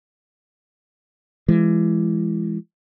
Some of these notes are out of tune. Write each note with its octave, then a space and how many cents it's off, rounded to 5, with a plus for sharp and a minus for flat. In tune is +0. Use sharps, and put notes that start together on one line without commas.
E3 +30 G#3 +0